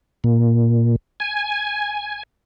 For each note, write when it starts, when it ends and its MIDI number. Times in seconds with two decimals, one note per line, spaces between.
0.24 0.96 46
1.20 2.23 80